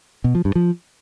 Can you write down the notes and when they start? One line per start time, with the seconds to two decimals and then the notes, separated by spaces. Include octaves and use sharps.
0.24 B2
0.35 F3
0.45 G2
0.55 F3